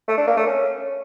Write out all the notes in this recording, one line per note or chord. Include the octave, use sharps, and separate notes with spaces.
A3
D4
A#3
A3
C#4